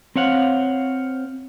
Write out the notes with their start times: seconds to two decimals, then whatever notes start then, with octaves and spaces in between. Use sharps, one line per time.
0.16 C4 C5 C#5 F5 F#5